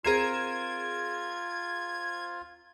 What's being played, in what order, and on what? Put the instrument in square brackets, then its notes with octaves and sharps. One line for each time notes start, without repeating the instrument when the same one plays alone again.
[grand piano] C4 A#4 C7 [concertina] F4 [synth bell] G#4 E7 [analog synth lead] G#6